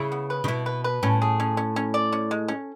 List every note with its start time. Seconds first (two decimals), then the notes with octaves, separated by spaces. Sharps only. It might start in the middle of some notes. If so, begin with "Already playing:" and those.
Already playing: C#3 E4
0.12 B3
0.30 B4
0.44 C#3
0.48 B2 E4
0.66 B4
0.84 B4
1.03 A2 C#4
1.22 G#4
1.40 C#4
1.57 C#4
1.76 C#4
1.94 D5
2.13 C#4
2.31 G#3
2.48 C#4